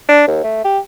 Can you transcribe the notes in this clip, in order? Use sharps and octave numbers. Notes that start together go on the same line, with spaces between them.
D4
D#2
A3
G4